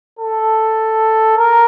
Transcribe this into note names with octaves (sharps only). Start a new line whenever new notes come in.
A4
A#4